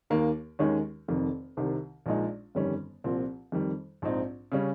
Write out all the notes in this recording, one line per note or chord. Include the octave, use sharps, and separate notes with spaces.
D#2 D#3 A#3
D#2 D#3 G#3 C#4
F1 F2 D#3
C2 C3 D#3
A#1 A#2 G#3 D#4
G1 F2 D#3 G3 C#4
C2 A#2 F3 C4
F2 D#3 G3
A#1 G#2 F3 C4 D#4
C#3 G3 C#4